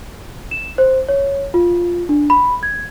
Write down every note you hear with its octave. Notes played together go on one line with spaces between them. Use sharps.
E7
C5
C#5
F4
D4
B5
G#6